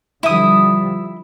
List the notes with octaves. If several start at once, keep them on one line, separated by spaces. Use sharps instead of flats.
D3 F3 G3 E4 E5 D#6